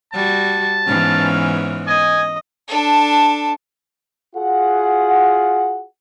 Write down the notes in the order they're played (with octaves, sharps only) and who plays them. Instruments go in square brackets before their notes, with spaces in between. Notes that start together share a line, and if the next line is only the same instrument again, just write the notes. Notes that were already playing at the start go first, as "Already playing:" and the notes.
[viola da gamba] G3 F#4 [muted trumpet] A5
[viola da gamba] G#2 E3 B3 [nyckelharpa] C#4 F5
[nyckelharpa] D#5 [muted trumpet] G#5
[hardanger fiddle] D4 A4
[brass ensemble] F4 F#4 G#4 F#5